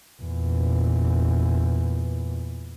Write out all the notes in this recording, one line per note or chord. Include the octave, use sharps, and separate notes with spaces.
E2 A#2